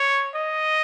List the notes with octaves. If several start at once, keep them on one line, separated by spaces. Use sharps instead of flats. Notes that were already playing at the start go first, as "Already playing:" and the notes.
Already playing: C#5
D#5